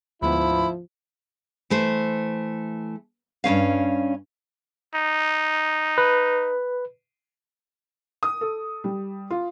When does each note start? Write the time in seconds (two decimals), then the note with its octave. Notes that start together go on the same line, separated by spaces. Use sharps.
0.22 D2 G#2 F3 B3 E4 B5
1.70 E3 A3 C5
3.44 G2 D#3 C#4 F5
4.94 D#4
5.98 B4
8.23 D#6
8.41 A4
8.84 G3
9.30 F4